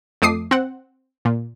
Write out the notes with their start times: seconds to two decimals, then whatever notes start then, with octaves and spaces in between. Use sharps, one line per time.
0.22 F2 A3 D6 D#6 C7
0.51 C4 F#5
1.25 A#2